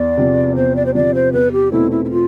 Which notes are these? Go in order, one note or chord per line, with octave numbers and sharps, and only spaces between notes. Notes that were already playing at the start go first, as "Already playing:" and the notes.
Already playing: E2 D5
C3 F3
E2 C5
D5
C5
C3 F3 D5
C5
E2 B4
G4
B2 A3 C4 E4
E4
E4
F4